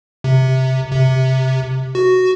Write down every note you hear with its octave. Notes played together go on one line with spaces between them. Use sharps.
C3
C3
F#4